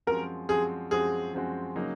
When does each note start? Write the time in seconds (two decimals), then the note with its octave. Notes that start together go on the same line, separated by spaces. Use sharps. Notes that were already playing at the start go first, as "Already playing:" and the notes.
0.07 F#2 F3 G#3 C4 F#4 A#4
0.49 F#2 F3 G#3 C4 F#4 G#4
0.91 F#2 F3 G#3 C4 F#4 G#4
1.33 F#2 F3 G#3 C4 F#4
1.76 C#3 F#3 A#3 D#4